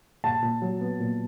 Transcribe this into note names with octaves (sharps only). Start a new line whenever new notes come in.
A#2 A5
A#2
F#3
B3
A#2